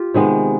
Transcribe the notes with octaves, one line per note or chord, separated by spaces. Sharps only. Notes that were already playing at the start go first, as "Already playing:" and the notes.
Already playing: F4 G4
C3 D#3 G#3 B3